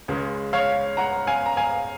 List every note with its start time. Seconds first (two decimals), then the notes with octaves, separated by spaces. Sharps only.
0.08 C#2 C#3 G#3
0.53 C#5 F5
0.97 F#5 A#5
1.27 F5 G#5
1.46 A#5
1.57 F5 G#5